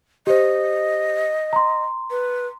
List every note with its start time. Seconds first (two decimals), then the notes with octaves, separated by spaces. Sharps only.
0.27 G4 C5 D#5
1.53 A#5 C6
2.11 B4